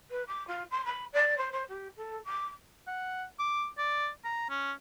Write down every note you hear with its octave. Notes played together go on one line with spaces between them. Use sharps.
B4
D6
F4
C6
B5
D5
C5
C5
G4
A4
D6
F#5
D6
D5
A#5
C#4